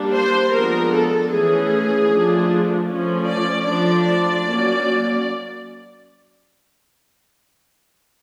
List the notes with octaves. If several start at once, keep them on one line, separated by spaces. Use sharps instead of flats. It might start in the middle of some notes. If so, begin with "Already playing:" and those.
Already playing: G3 A#3 D4
C5
F3 G#3 B3 D4 A#4
A4
E3 A3 C#4 G#4
F3 A3 D4
F3 A3 C#4
D5
F3 A3 D4 D5
D5
F#3 A#3 C#4